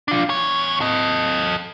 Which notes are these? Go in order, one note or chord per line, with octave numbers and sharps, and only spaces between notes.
D4 F4
E2 C#5
A4 D#5